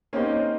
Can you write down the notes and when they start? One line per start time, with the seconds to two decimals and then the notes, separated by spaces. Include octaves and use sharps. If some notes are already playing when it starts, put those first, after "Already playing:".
0.13 A#3 C4 C#4 D#4 G4 C5 D#5